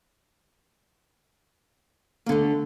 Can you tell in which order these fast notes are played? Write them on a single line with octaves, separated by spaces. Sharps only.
A#3 D3 A3